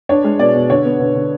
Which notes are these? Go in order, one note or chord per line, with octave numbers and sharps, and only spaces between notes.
D4 C#5
G#3
B2 D5
B2
D3 C#5
B3
D3
D3